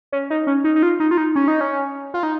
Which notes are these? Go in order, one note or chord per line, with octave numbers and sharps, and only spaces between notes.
C#4
D#4
C#4
D#4
D#4
F4
D#4
F4
D#4
C#4
D#4
C#4
F4
D#4